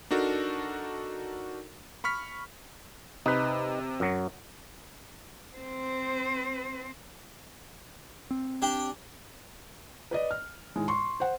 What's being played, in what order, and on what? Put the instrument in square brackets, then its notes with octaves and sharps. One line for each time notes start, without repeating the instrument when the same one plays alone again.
[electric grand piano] D4 D#4 F#4 A4 A#4
B5 C#6 F6 B6
[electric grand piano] C3 [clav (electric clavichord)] D#4 B4
[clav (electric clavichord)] F#2 F#3
[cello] C4 C5
[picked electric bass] C4
[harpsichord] D4 G4 G5
[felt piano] B4 D5 D#5
F6
A2 D#3 G#3
C6 C#6
C5 F#5